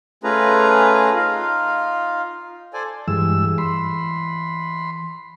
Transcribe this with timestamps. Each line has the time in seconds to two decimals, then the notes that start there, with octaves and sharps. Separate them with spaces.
0.24 A3 C#4 F4 G#4 B4 A#5
1.16 D#4 F4 F5
2.73 A4 C5 D5 G#5
3.08 G2 E3 G#3 E6
3.58 B5 C6